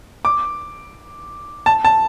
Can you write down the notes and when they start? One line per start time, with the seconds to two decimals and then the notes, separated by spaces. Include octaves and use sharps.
0.25 D6
1.66 A5
1.85 A5